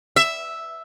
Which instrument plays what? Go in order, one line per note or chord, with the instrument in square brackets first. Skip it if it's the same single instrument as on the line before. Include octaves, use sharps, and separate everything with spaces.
[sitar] E5